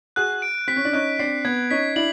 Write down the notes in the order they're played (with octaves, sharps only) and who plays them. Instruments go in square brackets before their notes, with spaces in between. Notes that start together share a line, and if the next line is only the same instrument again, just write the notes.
[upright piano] F#4 G#4 [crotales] F#6
[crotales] D7
[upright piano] C4 [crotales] B6
[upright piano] C#4
D4
[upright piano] C#4 D#4 [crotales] F#6
[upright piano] C4 D4 [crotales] C7
[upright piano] B3 [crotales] G#6
[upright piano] C#4 D#4 [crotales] B6
[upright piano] D4 E4 [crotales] F#7